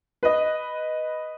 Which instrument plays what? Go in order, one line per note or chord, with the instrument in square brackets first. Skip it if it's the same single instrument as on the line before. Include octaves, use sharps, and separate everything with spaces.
[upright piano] B4 D#5